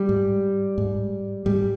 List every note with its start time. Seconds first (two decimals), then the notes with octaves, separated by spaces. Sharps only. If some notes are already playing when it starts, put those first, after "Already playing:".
Already playing: G3
0.09 G#2
0.78 G#2
1.46 G#2 G3